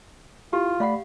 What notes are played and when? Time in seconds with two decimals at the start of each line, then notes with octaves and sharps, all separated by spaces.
0.53 E4 F4 G4
0.80 A3 D5 F5 F#5 B5